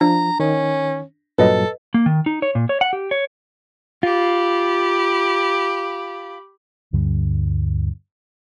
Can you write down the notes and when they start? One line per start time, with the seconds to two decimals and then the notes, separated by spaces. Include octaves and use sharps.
0.01 F3 D4 A#5
0.40 D#3 C#4
1.38 G2 A#2 F#3 A4 B4 D#5
1.94 A#3
2.06 D#3
2.26 D#4
2.42 C#5
2.55 A#2
2.69 C#5
2.81 F#5
2.93 G4
3.11 C#5
4.03 F4 G4 B5
6.93 D2 G2 D3 G3